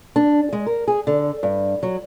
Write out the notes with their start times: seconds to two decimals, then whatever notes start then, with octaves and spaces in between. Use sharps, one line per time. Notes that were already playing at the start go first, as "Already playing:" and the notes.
0.16 D4
0.53 G#3
0.66 A#4
0.88 G#4
1.07 D3
1.43 G2
1.83 F#3